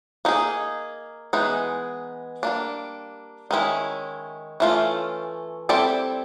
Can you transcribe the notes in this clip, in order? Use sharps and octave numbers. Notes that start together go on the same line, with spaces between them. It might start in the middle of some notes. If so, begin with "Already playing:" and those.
A#3 D#4 G#4
E3 G#3 B3 D#4 G#4
G3 A#3 D4
D#3 G#3 C#4 E4
E3 A3 C#4 F4
G3 C4 E4 A4 D5